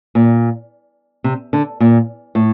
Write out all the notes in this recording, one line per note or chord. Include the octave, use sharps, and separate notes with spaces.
A#2
C3
D3
A#2
A2